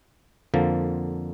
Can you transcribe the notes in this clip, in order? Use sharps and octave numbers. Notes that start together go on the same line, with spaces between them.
F2 D3 F3 A#3